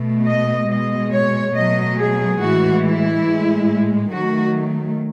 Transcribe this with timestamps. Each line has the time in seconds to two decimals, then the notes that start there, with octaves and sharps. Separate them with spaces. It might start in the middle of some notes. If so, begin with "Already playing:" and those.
Already playing: B2 A3
0.27 D#5
0.69 B2 G#3 D#5
1.12 C#5
1.55 B2 F#3 A3 D#5
1.98 G#4
2.40 A2 E3 G#3 F#4
2.83 E4
3.26 A2 G#3
4.11 D#3 F#3 A3 F#4